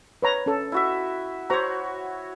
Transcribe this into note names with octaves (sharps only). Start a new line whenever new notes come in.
B4 C#5 A#5
C#4 A4
E4 F#4 E5
F#4 C5 C#5 A#5